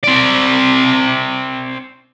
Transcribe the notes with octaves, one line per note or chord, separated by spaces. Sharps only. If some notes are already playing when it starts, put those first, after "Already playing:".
C4 D5